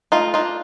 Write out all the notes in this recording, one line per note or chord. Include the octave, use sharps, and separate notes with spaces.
A3 D#4 F4
D4 D#4 F4